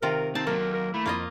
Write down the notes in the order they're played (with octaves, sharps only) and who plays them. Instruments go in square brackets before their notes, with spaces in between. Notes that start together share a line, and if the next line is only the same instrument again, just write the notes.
[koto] C3 D#3 F4 [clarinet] A#4
[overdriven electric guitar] C4 [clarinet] D#4 [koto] A5
[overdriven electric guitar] F#3 A4 [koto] A#3 [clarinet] A#4
[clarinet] A#4
[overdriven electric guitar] A3 [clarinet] E4
[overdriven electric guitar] F2 [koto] A#3 F4 D#5